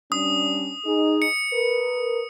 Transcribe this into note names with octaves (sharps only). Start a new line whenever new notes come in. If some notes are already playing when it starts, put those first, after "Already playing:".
G3 C#4 D4 D#6
D#4 G#4
C#7
A#4 B4